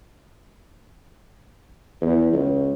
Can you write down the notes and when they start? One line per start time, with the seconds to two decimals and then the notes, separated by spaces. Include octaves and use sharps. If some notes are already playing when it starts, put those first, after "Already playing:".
2.01 E2
2.33 C#2